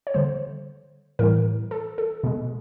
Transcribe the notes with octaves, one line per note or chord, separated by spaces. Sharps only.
C#5
D3 G3 C5
A2 E3 G3 A#4
A4
A4
B2 G#3